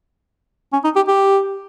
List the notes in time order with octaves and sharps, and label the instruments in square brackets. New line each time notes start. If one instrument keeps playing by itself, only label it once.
[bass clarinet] C#4
D#4
G4
G4